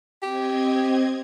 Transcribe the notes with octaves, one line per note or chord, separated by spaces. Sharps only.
C4 G4 D#5 G#6